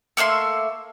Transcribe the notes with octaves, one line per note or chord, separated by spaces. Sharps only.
A3 A#3 E5 C6